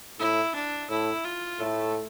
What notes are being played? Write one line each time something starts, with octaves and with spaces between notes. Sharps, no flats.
A2 E4
D4
A2 E4
F4
A2 A3